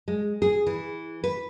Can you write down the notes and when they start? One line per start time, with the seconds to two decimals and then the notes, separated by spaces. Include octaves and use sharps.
0.08 G#3
0.42 G#4
0.66 E3
1.24 B4